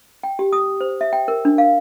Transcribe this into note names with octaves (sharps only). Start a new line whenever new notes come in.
G5
G4
D#6
C5
E5
G5
A#4
D4
F5